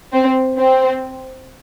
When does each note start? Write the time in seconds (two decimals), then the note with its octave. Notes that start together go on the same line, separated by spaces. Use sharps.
0.13 C4
0.58 C4